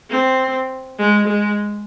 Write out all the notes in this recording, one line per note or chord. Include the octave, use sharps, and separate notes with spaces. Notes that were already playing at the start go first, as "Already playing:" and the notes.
C4
G#3
G#3